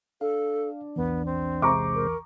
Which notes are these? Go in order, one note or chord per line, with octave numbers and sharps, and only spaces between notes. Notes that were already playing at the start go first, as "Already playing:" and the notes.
D4 A4 F5
A#1 E2 E3 B3
C4
C3 G#3 C5 A#5 C#6 D6
A#4